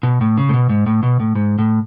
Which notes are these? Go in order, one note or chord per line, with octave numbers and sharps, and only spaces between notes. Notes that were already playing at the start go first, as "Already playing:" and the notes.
B2
A2
C#3
A2
B2
G#2
A2
B2
A2
G#2
A2